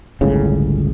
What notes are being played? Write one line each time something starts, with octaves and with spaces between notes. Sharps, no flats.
G1 C#2 A2 C#3